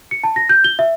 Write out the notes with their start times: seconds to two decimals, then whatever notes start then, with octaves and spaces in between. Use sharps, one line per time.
0.11 C#7
0.24 A5
0.36 A#6
0.49 G6
0.64 G7
0.79 E5